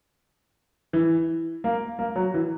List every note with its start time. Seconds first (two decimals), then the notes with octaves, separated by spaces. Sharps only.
0.93 E3
1.64 A#3
1.99 A#3
2.16 F#3
2.34 E3